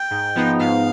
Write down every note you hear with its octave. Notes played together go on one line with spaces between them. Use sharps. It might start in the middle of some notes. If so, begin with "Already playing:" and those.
Already playing: G5
G#2
F3 B3 D#4
G#2 F5